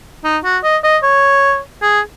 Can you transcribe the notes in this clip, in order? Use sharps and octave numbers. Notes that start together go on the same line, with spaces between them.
D#4
F#4
D#5
D#5
C#5
G#4